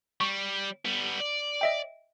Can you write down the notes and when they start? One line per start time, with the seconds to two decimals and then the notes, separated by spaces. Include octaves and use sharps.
0.21 G3 C#6
0.85 G3 B3
1.21 D5
1.61 D#5 E5 G5